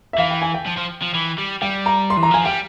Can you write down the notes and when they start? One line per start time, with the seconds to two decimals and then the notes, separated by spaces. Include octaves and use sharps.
0.13 E5
0.18 E3 F5
0.31 G5
0.42 G#5
0.54 G5
0.67 F3
0.78 F3
1.03 F3
1.15 E3
1.38 G3
1.62 G3 G5
1.86 A#5
2.10 C6
2.17 E3
2.23 A#5
2.31 F3 G#5
2.45 G3 G5